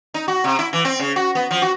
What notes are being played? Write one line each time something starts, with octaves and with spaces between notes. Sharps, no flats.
D#4
F#4
C3
E4
E3
C4
C#3
F#4
B3
F3
F#4